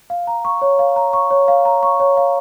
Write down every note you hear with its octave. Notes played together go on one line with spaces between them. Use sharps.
F5
A#5
C#6
C#5
F5
A#5
C#6
C#5
F5
A#5
C#6
C#5
F5